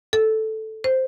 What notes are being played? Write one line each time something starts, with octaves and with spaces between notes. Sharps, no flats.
A4
C5